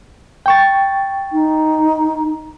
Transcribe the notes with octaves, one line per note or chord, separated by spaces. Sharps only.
G5 C#6 A6
D#4